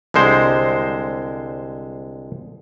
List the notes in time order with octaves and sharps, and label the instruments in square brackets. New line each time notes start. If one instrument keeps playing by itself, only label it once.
[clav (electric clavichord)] C2 D3 G#3 C5